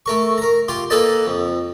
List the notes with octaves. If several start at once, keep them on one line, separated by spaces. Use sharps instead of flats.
A3 A#4 C#6
A#4 A#5
F4 G4 C6
A#3 A4 B4 D#5 G#5 A5
F2